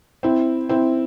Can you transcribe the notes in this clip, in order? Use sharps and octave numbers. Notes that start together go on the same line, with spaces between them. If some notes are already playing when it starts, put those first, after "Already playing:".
C4 E4
C4 E4